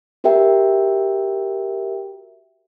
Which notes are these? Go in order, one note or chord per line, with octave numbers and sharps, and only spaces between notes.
F#4 G4 A#4 E5 G5